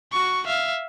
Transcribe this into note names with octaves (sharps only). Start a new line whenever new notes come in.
F#4 C#6
E5 F5